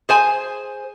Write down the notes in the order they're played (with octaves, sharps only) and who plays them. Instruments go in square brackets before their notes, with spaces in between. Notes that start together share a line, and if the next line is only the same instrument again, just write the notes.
[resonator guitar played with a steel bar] G#4 C5 G#5